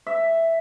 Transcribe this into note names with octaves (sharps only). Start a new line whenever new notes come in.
E5